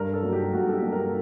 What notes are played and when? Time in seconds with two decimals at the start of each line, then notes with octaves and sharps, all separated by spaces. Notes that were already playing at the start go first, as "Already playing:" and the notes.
Already playing: G2 A#4
0.13 A4
0.23 F#3 A#3
0.33 G4
0.53 G2 F#4
0.69 A4
0.73 G4
0.82 F#3 A#3
0.92 A#4